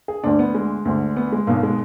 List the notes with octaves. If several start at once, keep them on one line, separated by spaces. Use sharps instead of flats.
G#4
D2 D3 D4
B3
G#3
D2 D3
B3
G#3
B1 B2 A#3
G#3